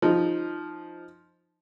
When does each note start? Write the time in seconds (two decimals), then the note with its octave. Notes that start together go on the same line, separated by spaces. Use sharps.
0.02 F3 D#4